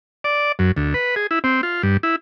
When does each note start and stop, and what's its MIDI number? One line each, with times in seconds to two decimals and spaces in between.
0.24 0.52 74
0.59 0.72 42
0.77 0.94 38
0.94 1.15 71
1.16 1.27 68
1.31 1.39 64
1.44 1.61 60
1.63 1.82 65
1.83 1.97 43
2.03 2.16 64